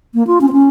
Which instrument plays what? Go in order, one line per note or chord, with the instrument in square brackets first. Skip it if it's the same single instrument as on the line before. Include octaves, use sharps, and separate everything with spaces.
[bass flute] A#3
F4
C#4
C4
C#4